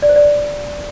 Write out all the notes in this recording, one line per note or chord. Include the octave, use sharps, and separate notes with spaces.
D5
C5
D5